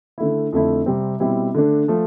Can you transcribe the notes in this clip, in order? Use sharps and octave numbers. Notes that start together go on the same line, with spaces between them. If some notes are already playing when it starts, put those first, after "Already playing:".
D3 A3 E4
F2 D3 A3 E4
C3 G3 C4
B2 G3 C4 E4
D3 A3 D4
F3 A3